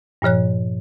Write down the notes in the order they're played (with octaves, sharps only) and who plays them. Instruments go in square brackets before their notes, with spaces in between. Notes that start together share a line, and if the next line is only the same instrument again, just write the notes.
[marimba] G2 A#2 F3 C#5 F#6